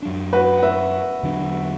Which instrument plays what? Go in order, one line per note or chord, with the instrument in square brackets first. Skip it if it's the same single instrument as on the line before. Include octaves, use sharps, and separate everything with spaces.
[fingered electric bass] F#2 F#3 D4
[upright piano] F#4 B4
F#5
B4 E5
[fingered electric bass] E2 D3 F#3 D4